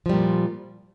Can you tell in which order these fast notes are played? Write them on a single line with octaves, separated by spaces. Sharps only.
F3 G3 A#2